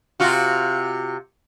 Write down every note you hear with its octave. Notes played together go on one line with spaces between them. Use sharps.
C3 F4 F#4